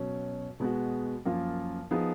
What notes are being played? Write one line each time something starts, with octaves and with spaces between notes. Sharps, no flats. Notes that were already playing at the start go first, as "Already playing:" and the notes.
Already playing: B2 F#3 C#4
B2 G#3 B3 F#4
F#2 F3 A#3 F4
F3 B3 D#4 G#4